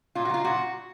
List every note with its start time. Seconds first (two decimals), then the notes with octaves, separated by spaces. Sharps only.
0.15 A#2 F4
0.25 F#4
0.30 F#3 F4
0.44 A#2 F#4